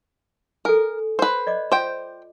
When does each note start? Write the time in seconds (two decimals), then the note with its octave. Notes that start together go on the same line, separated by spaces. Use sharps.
0.65 A4 A#4 G#5
1.19 B4 C5
1.47 D5 D#5 D6
1.72 F4 C5 G5 D6